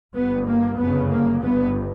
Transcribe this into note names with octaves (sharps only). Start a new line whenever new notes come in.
G1 G2 B3
A#3
G1 F#2 C#3 B3
A#3
G1 G2 B3